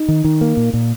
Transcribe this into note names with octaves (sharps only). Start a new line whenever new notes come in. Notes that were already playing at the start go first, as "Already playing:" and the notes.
Already playing: D#4
D#3
D#3
A#3
A#2
A#2